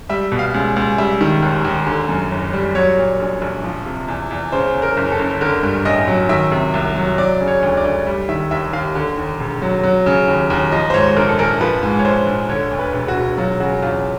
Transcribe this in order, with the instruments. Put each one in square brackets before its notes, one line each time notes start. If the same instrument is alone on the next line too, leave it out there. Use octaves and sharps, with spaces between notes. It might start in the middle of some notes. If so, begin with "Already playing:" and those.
[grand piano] G3 E5
B2
F5
C#2
C#2
G3 E5
D#3
D#2
D#2
D3
F#2
F#1
G3
F#3 C#5
A#2
A#1
A#1
F3
C3
E2
E2
C#3 C5
E2
A#4
F#1
A4
F#1
D3 A#4
G2
A1 D#5
F#3
D#3 E5
C3
C2
F#3
F#3 D5
C#3
C#5
D2
D5
D2
G3
D#3 E5
D#2 E5
D#2 F5
D3
D#2
E1
F#3
F#3
C#3
D#2
D#2
F3 D#5
C5
G#2 C#5
A#1 A#4
A4
A#1 A#4
F3 B4
G#2
C#5
A#1 C5
A#1
D3 C#5
D2
B4
E1
F#4
E1
F#3 F4
C#3 F#4
E2 F4